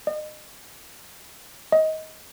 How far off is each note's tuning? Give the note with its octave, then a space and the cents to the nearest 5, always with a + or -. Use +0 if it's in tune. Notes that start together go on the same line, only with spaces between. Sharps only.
D#5 -35
D#5 +20